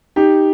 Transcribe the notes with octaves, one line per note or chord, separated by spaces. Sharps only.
D#4 G4